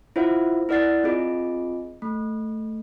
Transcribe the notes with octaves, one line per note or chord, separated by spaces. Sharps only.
E4 F4 C5 E5 F#5
E4 A#4 D5 F#5 A6 C7
C4 F4 G#4 D#5
A3